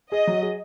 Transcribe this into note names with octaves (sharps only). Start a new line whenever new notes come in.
G#4 D#5
F#3
G#4